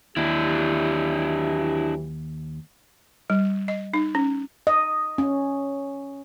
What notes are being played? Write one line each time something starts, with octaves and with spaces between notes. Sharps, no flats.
D#2 E3 F#3 D4 E4 G4
G3
D#5
D#4
C#4
D#5
C#4